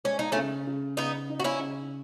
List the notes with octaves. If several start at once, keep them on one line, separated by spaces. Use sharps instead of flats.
G#3 C#4
D#4
A3 C#4
C#3
C#3
C#3 B3 D#4
D#4
F#4
C#4 E4
C#3